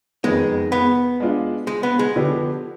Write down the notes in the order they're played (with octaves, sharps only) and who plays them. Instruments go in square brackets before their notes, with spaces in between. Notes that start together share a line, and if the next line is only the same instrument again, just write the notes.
[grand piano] F2 D#3 B3 [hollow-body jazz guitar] G#3
[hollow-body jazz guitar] B3
[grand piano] G#3 D4 F4
[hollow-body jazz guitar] G#3
B3
G#3
[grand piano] D3 F3 B3 D4 G4